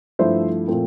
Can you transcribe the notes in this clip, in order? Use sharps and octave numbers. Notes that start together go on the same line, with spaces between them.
G2 F3 A3 E4 C5 E5
A#2 F3 A3 C4